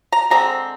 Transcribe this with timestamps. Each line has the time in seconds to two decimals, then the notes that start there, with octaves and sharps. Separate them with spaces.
0.12 A#5
0.30 D3 G#3 C4 A#5